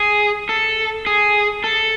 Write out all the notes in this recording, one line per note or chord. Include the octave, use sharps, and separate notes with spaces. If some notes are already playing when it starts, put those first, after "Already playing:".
Already playing: G#4
A4
G#4
A4